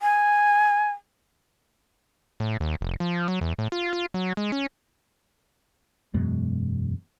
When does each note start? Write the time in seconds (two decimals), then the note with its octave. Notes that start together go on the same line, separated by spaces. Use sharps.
0.02 G#5
2.40 A2
2.60 D#2
2.81 F1
3.00 F3
3.28 F#3
3.41 E2
3.59 A2
3.72 F4
3.93 F4
4.14 F#3
4.37 G#3
4.52 C#4
6.14 E1 F#2 B2 G#3